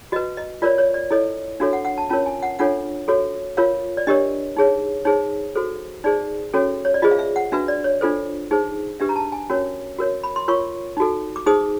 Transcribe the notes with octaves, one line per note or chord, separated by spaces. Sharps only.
F#4 B4 D#5
D#5
F4 A#4 C#5 D5
C#5
D5
E4 A4 C#5 D#5
D4 F#4 A4 C#5 F5
F#5
F#5
A5
C#4 F4 A#4 C#5 A5
G#5
F#5
D4 F4 A4 C#5 F#5
F#4 A4 C#5
F4 A#4 C#5 F5
D5
D4 G4 A#4 C#5 D#5
D#4 G#4 C#5
D#4 G#4 C5 C#5
F#4 A4 C5
D#4 G#4 C5 D5
C#4 F#4 A4 C#5
C#5
D5
F4 G#4 C5 D#5
F5
E5
F#5
D4 F#4 B4 E5
D5
C#5
D4 F4 A4 C5
D#4 G#4 C5
D4 G4 B4 E5
A#5
A5
G#5
C#4 F#4 A#4 C#5
F#4 A#4 C#5
B5
C6
F4 A#4 C#5 C#6
D#4 F#4 A4
D6
D#4 G#4 C5 D#6